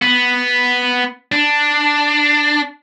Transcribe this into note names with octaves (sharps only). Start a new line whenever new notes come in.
B3
D4